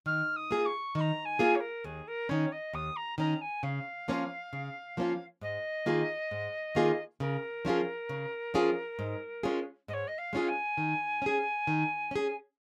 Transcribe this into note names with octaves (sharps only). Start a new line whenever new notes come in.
D#3 F6
D#6
A#3 F4 G#4
C#6
D#3 A#5 C#6
G#5
A#3 F4 G#4
C#5
A#4
D#2 G#4
A#4
D#3 C#4 C#5
D#5
D#2 D#6
A#5
D#3 C#4 A#5
G#5
C#3 F5
F3 A#3 C#4 F4
C#3
F3 A#3 C#4 F4
G#2 D#5
D#3 A#3 F4 G#4
G#2
D#3 A#3 F4 G#4
C#3 A#4
F3 C#4 F4 G#4
C#3
F3 C#4 F4 G#4
G#2
G#3 C#4 F4 G#4
G#2 C#5 D#5
D#5
F5
G#3 C#4 F4 G#4
G#5
D#3
C#4 G#4
D#3
C#4 G#4